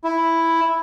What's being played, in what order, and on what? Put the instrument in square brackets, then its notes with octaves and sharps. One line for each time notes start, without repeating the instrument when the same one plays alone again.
[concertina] E4